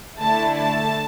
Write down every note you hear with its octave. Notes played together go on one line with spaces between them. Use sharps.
D3 A3 E4 A5
A5